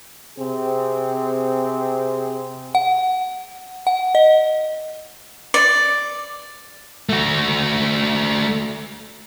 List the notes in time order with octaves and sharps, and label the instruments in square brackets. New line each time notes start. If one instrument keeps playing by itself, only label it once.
[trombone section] C3 C4 G#4
[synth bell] F#5
F#5
D#5
[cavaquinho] D5
[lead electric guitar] A3 F#4